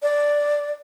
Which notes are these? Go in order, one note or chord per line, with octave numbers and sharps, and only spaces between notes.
D5